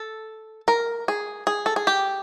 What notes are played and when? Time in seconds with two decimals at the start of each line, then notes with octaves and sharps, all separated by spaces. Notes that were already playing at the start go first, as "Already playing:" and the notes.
Already playing: A4
0.68 A#4
1.08 G#4
1.47 G#4
1.66 A4
1.76 G#4
1.87 G4